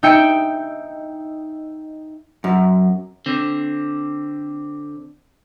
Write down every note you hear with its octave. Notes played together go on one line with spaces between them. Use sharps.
D#4 E5 G5 C#7 D7
F#2
D3 C4